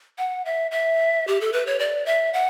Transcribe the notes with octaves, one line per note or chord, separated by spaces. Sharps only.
F#5
E5
E5
G4
A4
B4
C#5
D5
E5
F#5